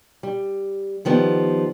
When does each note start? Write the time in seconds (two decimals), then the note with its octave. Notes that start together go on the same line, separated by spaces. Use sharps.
0.23 G3
1.05 D#3 F3 G3 B3